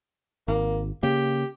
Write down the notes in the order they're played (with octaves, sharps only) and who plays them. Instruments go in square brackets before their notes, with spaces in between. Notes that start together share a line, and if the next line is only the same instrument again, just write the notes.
[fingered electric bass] G#1 [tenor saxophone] A#3
[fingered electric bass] C#3 A#3 [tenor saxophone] G4